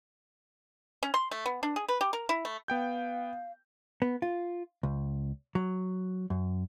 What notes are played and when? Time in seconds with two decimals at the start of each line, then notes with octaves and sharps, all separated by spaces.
1.03 C#4
1.14 C6
1.31 A3
1.46 B3
1.63 D4
1.76 G#4
1.89 B4
2.01 G4
2.13 A#4
2.29 E4
2.45 A3
2.68 B3 F5 G5 G6
4.02 B3
4.22 F4
4.83 C#2
5.55 F#3
6.30 F#2